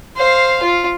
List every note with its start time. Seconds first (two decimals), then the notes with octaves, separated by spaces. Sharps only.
0.17 C5 F5
0.63 F4